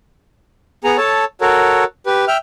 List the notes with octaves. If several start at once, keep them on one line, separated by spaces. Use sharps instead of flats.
B3 G#4 A#5
A4 C#5 A5
F#4 A4 A#4 C#5
G4 B4
E5 G5 F6